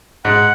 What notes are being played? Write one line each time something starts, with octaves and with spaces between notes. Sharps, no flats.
G#2 F#5